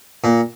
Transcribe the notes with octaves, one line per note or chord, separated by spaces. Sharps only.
A#2